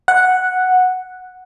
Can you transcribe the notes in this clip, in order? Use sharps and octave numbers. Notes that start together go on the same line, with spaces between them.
F#5